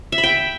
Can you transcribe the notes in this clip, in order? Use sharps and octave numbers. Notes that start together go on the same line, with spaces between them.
E5
B5
G5